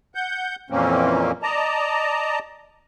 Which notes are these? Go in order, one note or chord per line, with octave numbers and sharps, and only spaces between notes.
F#5 G6
F2 A#2 E3 A#3 C4 C#4
D5 D#5 A5 A#5